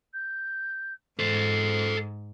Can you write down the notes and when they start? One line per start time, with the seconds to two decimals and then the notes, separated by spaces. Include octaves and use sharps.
0.14 G6
1.19 G#2 A4 C5 C7